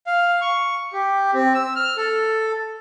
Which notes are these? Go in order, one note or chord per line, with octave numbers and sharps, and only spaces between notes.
F5
C#6
G4
C4
E6
F6
A4